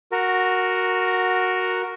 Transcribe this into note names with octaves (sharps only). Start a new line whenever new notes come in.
F#4 A#4